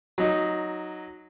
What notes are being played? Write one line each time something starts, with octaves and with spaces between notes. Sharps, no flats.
F#3 D#4